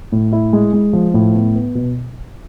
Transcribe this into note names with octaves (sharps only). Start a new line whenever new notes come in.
A2
E4
G#3
G#3
F3
A2
B3
B3
B2